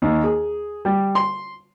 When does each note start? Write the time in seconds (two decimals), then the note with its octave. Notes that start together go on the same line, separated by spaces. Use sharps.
0.02 D#2
0.24 G#4
0.85 G3
1.15 C6